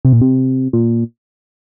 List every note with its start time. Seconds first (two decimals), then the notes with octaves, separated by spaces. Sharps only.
0.05 C3
0.13 A#2
0.21 C3
0.73 A#2